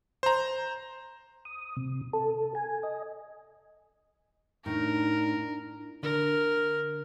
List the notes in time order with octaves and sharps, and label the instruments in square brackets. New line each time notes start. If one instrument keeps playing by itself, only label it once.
[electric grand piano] C5 A#5
[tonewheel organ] D#6
C3
A4
G#5
D#5
[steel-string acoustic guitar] A2 [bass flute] D4 [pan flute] D#4 [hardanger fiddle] A#4
[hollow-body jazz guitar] D3 [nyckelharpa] A#4